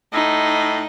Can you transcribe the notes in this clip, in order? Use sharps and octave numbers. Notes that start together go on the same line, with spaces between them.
A2 D#4